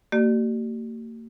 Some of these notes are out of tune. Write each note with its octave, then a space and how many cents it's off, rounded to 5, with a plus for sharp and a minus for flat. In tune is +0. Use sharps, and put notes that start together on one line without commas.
A#3 -40 G4 -45 D5 +30